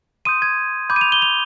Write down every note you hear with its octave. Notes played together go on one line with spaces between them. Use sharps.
C6 D#6 G6 D#7
G#6
B5 D6 G6
D#7
F7
G7
F7